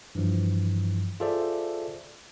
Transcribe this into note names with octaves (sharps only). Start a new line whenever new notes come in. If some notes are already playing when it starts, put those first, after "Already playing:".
G2 E3 F3
F4 G#4 A4 C5 D5 E5